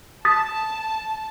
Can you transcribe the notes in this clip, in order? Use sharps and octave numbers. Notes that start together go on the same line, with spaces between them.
A5 D#6 A6 B6